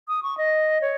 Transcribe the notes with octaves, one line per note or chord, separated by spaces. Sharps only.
D#6
C#6
D#5
C#5